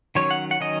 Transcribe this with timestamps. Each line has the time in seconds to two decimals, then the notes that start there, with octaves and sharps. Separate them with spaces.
0.15 D#3 F#3 C#4 C#5
0.31 F#5
0.51 F#5
0.60 D#3 F#3 C#4 D#5